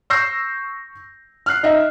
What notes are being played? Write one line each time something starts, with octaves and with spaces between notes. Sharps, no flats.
C#6 E6 G6 A#6 C7
F6 F#6 C7
D#4 D#5 E5